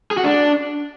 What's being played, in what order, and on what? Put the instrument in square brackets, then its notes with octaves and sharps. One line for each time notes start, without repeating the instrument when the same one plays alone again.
[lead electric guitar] G#4
F#4
D4